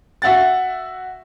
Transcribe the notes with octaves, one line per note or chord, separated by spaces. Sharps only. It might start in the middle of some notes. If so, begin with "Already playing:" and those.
F#4 E5 F#5 A6